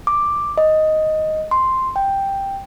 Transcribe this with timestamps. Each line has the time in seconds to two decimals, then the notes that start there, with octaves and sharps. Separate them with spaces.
0.07 D6
0.58 D#5
1.51 C6
1.96 G5